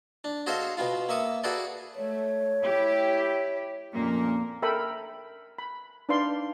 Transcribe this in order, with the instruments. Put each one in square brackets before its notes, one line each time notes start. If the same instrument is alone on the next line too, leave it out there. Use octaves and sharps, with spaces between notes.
[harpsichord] D4
F#4 G#4 A4 C5 D#5 F5
B2 B3 F4
A#3 E5 C#6 D#6
F#4 G#4 A4 B4 D5
[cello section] A3 [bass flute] C#5
[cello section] E4 G4
[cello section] F2 A#2 A#3 [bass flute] C#4
[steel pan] A4 A#4 E5 G5 B5
B5
D4 D#4 B4 D5 F5 C6